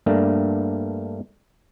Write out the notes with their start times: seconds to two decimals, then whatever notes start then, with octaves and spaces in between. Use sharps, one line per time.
0.06 G2 A3 A#3 D4